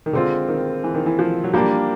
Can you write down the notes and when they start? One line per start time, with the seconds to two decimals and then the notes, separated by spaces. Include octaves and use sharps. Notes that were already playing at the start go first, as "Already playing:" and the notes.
0.06 D#3
0.13 D3 G#3 C4 F4
0.49 D#3
0.84 E3
0.94 D#3
1.06 E3
1.19 F3
1.44 F#3
1.53 F3 G3 A#3 D4 G4 A#4